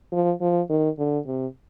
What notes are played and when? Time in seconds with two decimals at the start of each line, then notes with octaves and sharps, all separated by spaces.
0.12 F3
0.41 F3
0.69 D#3
0.98 D3
1.26 C3